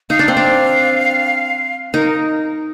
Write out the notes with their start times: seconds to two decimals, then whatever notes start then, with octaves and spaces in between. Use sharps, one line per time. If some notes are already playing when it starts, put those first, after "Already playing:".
0.10 D#4 F5
0.19 D4
0.28 C4
0.37 D4
1.94 D#4 A#4